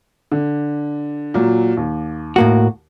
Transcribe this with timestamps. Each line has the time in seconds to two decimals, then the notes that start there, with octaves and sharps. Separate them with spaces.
0.32 D3
1.34 A#2 F#3
1.77 D#2
2.36 A2 A#3 F#4